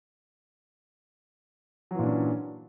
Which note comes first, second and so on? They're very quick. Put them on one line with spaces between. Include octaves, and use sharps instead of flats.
F#3 E3 A#2 D4 C#4